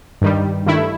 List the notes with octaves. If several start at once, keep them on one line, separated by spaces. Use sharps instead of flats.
G2 D#3 G3
G2 D#3 A3 E4